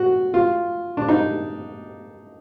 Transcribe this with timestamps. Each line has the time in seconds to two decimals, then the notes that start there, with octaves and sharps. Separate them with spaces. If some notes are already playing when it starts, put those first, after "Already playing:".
Already playing: F#4
0.34 F4
0.97 D4
1.09 D#4